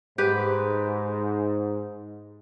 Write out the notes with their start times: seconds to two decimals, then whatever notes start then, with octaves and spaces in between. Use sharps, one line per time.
0.18 G#2 G4 B4